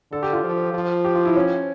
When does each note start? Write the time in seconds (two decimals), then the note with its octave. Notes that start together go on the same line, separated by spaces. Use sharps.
0.12 D3 A4
0.23 G4
0.33 F4
0.44 F3
0.74 F3
1.05 G4
1.15 F4
1.25 E4
1.36 C#4